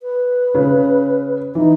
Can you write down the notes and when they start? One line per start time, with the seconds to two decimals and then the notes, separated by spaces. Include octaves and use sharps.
0.01 B4
0.55 C#3
1.55 E3 D#4